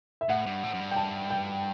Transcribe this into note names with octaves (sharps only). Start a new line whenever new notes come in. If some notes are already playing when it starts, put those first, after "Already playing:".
E5
A2 F#5
G2
A2
F#2
G2
G5
A5
G5